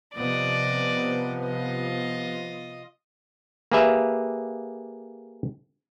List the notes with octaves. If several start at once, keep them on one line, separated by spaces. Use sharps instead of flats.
C3 F3 B3 D5 D#5
F4 D#5
A#3 G4 G#4 B4 E5 F5